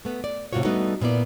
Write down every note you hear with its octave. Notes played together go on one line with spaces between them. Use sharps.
A3 B3
D5
A2 C3 F#3 F4 F#4 C#5
G3 A3 B3 D4 D#4 F#4
A#2 B3 E4 D5